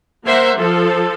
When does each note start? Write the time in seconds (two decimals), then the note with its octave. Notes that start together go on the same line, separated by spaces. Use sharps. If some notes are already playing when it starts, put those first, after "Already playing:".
0.25 A#3 A#4 C5 E5 F#5
0.56 F3 A4